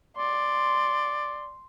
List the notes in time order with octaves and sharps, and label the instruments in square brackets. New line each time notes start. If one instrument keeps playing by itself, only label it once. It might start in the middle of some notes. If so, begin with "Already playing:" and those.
[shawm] D5 [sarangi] C6